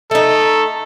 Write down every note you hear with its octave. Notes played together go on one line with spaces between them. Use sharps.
A3 D#4 A4